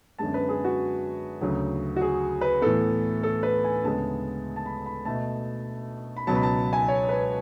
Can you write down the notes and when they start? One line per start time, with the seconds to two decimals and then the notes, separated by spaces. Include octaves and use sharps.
0.18 F#2 D3 G#3 B3 A5
0.34 B4
0.49 G#4
0.65 F#4
1.41 D2 C#3 F#3
1.96 F#4
2.01 G#4
2.41 B4
2.62 A2 E3 B3 A4
3.23 A4
3.43 B4
3.64 G#5
3.84 D2 C#3 G#3 B3 A5
4.56 A5
4.66 B5
4.86 B5
5.05 B2 A3 A5
6.17 B5
6.27 C#2 B2 F#3 B3 A5
6.35 B5
6.43 A5
6.73 G#5
6.88 C#5
7.09 B4